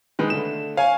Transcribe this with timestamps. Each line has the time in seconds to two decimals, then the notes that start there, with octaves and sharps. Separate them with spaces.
0.19 D#3 G#3 B4
0.30 D3 A3 E7
0.77 C#5 F5 G#5